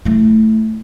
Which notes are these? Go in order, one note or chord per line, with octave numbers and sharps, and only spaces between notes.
A3 E4